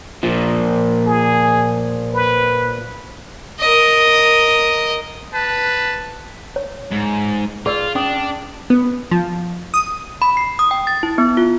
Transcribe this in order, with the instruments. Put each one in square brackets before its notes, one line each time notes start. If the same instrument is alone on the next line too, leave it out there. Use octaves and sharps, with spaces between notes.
[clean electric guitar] A#2 F3
[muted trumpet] G#4
B4
[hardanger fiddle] A#4 D#5
[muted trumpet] B4 [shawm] A5
[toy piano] C#5
[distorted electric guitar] G#2
[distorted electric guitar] F4 [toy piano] G#4 D5 E6
[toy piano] C#4 D#6 [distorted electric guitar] D4
[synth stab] B3
F3
D#6
[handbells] B5
C7
D#6
G5
A6
E4
B3
F4